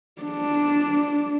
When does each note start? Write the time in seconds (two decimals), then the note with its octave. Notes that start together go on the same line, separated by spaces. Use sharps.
0.22 D4